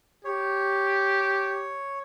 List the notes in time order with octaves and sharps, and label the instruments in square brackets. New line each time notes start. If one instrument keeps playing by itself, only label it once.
[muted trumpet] G4 [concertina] C#5